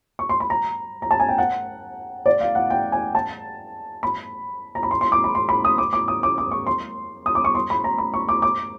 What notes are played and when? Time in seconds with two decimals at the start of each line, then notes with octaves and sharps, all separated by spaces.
0.19 C#6
0.29 C6
0.40 B5
0.50 A#5
1.02 A#5
1.11 A5
1.20 G#5
1.29 G5
1.38 F#5
2.26 D5
2.41 F5
2.55 F#5
2.70 G5
2.92 G#5
3.15 A5
4.03 B5
4.75 A#5
4.83 B5
4.91 C6
5.01 C6
5.12 D6
5.24 B5
5.35 C6
5.49 B5
5.65 D#6
5.78 D6
5.93 D6
6.08 D#6
6.23 D6
6.38 D6
6.51 C#6
6.67 C6
7.26 D#6
7.35 D6
7.45 C#6
7.55 C6
7.70 B5
7.84 A#5
7.98 B5
8.14 C#6
8.29 D6
8.42 D6